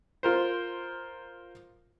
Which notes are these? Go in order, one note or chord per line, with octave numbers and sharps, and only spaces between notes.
F4 A#4 C5